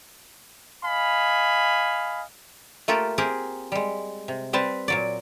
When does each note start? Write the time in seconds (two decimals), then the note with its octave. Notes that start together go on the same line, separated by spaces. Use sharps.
0.84 D#5 F5 G#5 B5
2.88 A3 A#3 F4 G4 A4 A#4
3.18 C4 G4 G#4 A#4
3.72 G3 G#3
4.28 C3
4.53 G3 C4 B4 A5
4.88 A#2 F#3 D5